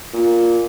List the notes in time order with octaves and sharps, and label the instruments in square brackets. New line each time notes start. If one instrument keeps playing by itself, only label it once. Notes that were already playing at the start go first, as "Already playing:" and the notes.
[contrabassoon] A#2